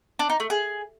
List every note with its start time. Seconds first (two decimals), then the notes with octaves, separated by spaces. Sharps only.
0.19 D4
0.30 D#4
0.40 A3
0.50 G#4